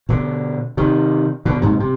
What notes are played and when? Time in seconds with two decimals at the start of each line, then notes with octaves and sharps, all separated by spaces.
0.09 B2 D3
0.77 C3 D#3
1.45 B2 D3
1.62 G#2 C3
1.80 C3